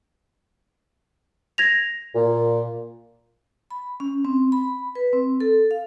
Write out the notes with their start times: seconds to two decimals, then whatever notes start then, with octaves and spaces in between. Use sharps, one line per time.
1.58 G#6 A#6 F7
2.15 A#2
3.71 B5
4.00 C#4
4.25 C4
4.52 B5
4.95 B4
5.13 C4
5.40 A4
5.71 F5